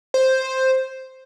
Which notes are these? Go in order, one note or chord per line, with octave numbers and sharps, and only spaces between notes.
C5